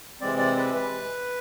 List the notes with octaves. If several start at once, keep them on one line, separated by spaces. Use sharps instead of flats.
C3 E3 G#3 C4 D5
D5
B4
B4